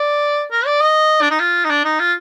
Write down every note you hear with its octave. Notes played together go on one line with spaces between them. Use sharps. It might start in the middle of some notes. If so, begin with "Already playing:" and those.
Already playing: D5
A#4
D5
D#5
D4
D#4
F4
D#4
D4
D#4
F4